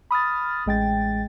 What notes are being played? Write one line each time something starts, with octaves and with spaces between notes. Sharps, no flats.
B5 D#6 F6 A6
A1 G#3 G5 A6